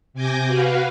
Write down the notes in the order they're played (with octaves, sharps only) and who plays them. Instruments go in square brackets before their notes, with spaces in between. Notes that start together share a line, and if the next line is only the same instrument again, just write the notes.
[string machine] C3 G#5 D6 G6 A#6
F#4 B4 F5